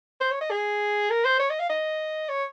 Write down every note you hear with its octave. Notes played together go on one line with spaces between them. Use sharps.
C5
C#5
D#5
G#4
A#4
C5
C#5
D#5
F5
D#5
C#5